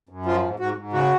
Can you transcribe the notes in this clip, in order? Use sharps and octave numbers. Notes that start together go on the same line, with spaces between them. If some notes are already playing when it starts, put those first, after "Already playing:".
F#2
F3 F4
G#2
G#2 F#4
G#2
C#3 F#4